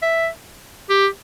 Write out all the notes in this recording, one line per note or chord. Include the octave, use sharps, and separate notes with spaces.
E5
G4